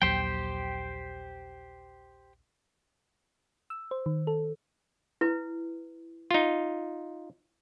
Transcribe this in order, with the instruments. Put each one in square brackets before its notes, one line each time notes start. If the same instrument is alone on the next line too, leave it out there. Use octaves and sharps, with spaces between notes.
[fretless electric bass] A#1 D#2 F#3 [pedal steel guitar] G4 C5 G5
[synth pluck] E6
C5
D#3
A4
[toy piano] E4 B4
[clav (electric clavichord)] D#4 F4